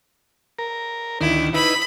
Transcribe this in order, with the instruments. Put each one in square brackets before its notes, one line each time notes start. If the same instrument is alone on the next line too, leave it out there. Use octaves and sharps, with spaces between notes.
[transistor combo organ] A#4
[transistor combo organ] D2 D#3 [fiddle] E4
[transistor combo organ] D#4 E4 B4 [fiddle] B5